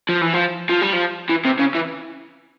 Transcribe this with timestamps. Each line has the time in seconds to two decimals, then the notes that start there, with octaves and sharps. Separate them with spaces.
0.09 F3
0.21 E3
0.33 F3
0.69 F3
0.81 G3
0.93 F3
1.29 E3
1.45 C3
1.59 C#3
1.74 E3